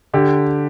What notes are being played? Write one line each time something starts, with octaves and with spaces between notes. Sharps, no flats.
D3 G4